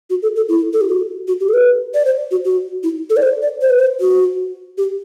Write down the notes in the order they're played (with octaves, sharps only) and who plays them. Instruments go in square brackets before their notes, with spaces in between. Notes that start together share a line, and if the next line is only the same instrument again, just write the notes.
[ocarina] F#4
A4
A4
E4
A4
G4
F#4
F#4
G4
A4
B4
D5
C5
F#4
F#4
E4
A4
D5
C5
D5
C5
B4
C5
F#4
G4